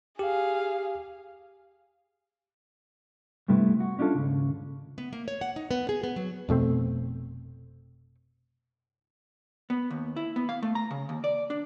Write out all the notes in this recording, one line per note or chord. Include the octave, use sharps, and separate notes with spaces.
G4 G#4 F5
G2 C3 G3 A3 B3 E4
F#4
C#4 D4 E4 F4 A4
D#2 G#2 C#3
B3
A#3
C#5
F#5
D#4
B3
G#4
B3
F#3
F1 B2 A3 C4
B3
D#2
E4
B3
F5
A3
A#5
C#3
D#2
D5
D4